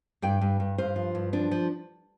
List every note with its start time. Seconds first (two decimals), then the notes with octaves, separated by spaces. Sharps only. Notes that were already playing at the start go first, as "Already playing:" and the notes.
0.22 G2 D5 G5
0.41 G2
0.60 G2
0.78 G2 C5 F5
0.96 F3
1.15 G2
1.33 F3 D4
1.51 F3